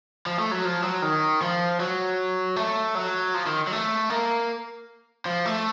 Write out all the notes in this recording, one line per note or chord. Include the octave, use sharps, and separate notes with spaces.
F3
A3
F#3
F3
F#3
D#3
F3
F#3
A3
F#3
F3
D#3
F#3
A3
A#3
F3
A3